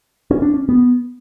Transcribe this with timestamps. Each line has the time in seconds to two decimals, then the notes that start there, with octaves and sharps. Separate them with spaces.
0.31 C#4
0.42 D4
0.54 C#4
0.69 B3